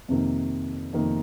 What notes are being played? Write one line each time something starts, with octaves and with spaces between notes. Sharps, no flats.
F2 C3 D#3 A#3
F2 C3 D#3 A#3